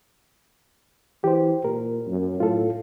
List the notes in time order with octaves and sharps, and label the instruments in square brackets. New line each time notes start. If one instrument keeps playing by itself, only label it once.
[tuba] E3 [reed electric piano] G4 C5
[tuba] A#2 [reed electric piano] A#4
[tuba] F#2
[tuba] A2 [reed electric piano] F4 A4